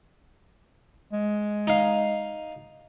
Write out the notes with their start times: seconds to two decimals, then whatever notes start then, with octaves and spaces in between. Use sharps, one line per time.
1.13 G#3
1.67 D#4 F5